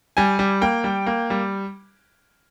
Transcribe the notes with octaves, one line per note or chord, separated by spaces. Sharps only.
G3 G#5
G3
A#3 G5
G3
A#3
G3